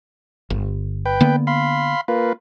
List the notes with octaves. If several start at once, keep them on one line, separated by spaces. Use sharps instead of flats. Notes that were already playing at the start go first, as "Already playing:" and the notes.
G1
B4 G5
D3 A#3 B3
F5 B5 C6
A#3 F4 B4